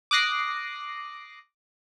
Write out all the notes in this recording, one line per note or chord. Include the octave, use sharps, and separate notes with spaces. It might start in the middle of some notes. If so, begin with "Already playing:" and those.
D6 D#6 F#6 A#6 C7